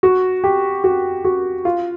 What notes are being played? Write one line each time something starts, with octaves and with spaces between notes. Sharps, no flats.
F#4
G4
F#4
F#4
F4